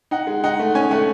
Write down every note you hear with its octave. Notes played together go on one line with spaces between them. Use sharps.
D#4 F#5
G#3
D#4 F#5
A3
C#4 G#5
A3 F#5